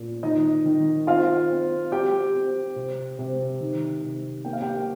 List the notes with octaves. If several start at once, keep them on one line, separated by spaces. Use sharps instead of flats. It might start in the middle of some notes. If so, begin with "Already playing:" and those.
Already playing: A#2
D#3 D#4 D#5
D#3
C4 F4 F5
C4
C4 G4 G5
C4
C3
C3
D#3
C3
A#3 G5
F5
G4 G5